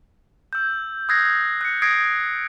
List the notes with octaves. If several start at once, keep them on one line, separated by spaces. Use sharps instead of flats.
E6 G6
D#6 E6 F#6 G#6 A#6 C7
F#6 C#7
D#6 G#6 A#6 C7 D7